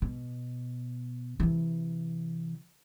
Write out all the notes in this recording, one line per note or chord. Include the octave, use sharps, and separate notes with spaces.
B2
C3 E3